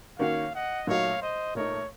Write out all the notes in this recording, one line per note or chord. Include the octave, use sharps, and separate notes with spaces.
D#3 A#3 C#4 F#4 C#5 F5
D#5 F#5
A#2 F#3 A3 D#4 F#4 C#5 F5
C5 D#5
A#2 A3 D#4 A#4 C#5